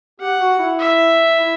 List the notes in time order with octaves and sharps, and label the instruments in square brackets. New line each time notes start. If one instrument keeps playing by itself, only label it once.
[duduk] G4 [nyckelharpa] F#5
[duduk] F#4
E4
[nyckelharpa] E5
[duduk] E4